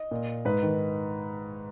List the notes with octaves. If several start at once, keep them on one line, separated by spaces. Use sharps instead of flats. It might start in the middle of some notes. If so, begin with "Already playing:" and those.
Already playing: D#5
A#2
G#2 B4
D#3